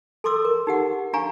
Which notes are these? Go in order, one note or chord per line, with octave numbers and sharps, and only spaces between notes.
A4 C6 D6 E6
A#4
D#4 G4 F#5
D4 F5 G#5 A#5 C#6